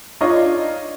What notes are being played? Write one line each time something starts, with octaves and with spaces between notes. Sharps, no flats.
D4 D#4 F4 C#5 D#5